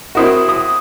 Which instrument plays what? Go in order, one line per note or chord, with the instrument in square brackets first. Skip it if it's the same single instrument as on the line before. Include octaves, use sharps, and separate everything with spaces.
[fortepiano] C4 E4 F#4 [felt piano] A#4 D#6
[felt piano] D#6